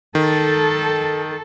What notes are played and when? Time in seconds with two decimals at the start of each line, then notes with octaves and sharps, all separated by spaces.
0.15 D#3 A4